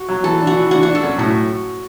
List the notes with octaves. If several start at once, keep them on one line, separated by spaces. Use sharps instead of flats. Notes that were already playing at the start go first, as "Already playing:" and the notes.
Already playing: F#4
F#3
E3 A4
D4
F#4
E3
D4 F#4
D4 F#4
A4
F#2
A2 F#4